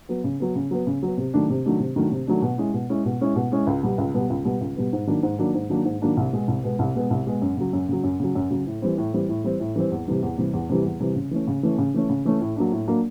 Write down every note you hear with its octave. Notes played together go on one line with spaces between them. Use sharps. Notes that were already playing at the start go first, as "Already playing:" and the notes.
F#3 B3
C#3
F#3 B3
C#3
F#3 B3
C#3
F#3 B3
C3
D#3 F#3 A3 D4
C3
D#3 F#3 A3 D4
C3
D#3 F#3 A3 D4
C3
D#3 F#3 A3 D4
B2
G#3 C#4 E4
B2
G#3 C#4 E4
B2
G#3 C#4 E4
B2
G#3 C#4 E4
C#2
B2 G3 B3
C#2
B2 G3 B3
C#2
B2 G3 B3
C#2
B2 G3 B3
G#2
D#3 F#3 A#3 D4
G#2
D#3 F#3 A#3 D4
G#2
D#3 F#3 A#3 D4
G#2
D#3 F#3 A#3 D4
C2
B2 G#3 B3
C2
B2 G#3 B3
C2
B2 G#3 B3
C2
B2 G#3 B3
F#2
C#3 F#3
F#2
C#3 F#3
F#2
C#3 F#3
F#2
C#3 F#3
A2
E3 G3 C4
A2
E3 G3 C4
A2
E3 G3 C4
A2
E3 G3 C4
E2
C3 E3 G3
E2
C3 E3 G3
E2
C3 E3 G3
E2
C3 E3 G3
C#3
E3 A3 C#4
C#3
E3 A3 C#4
C#3
E3 A3 C#4
C#3
E3 A3 C#4
A2
F#3 A#3 D4
A2
F#3 A#3 D4